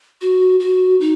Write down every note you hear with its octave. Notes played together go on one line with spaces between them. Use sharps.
F#4
F#4
D#4